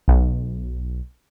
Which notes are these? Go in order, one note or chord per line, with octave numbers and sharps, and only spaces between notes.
B1